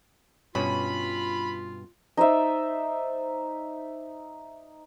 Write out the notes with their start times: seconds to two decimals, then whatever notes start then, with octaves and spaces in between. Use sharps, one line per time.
0.55 G2 B2 C#4 F4 B5
2.17 D#4 C5 D5 E5